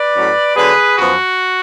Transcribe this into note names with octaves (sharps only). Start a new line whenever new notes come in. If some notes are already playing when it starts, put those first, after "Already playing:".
Already playing: B4 D5
A2 F#3 C#4
D3 F#3 B3 D4 G#4 B4
F#2 F3 B3 F#4